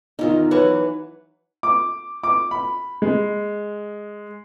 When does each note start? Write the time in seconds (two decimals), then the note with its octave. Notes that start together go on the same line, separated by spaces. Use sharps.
0.19 E2 D#3 D#4 F4
0.51 E3 F#3 B4 F#5 C#6
1.63 D6
2.24 D6
2.51 B5
3.02 G#3